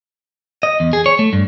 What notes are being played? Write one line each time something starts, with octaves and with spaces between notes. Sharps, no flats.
D#5
E2
G#4
C#5
A3
G2